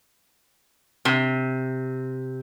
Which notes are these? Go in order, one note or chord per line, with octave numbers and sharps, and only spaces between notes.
C3